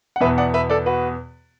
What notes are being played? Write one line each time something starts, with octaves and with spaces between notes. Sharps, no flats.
F#5
E2 B2 B3 B4 E5
D5 F#5
B4 E5
A4 D5
F#4 B4